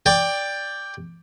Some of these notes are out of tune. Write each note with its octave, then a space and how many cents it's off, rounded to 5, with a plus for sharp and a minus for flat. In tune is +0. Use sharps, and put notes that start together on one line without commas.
D5 +0 G5 +15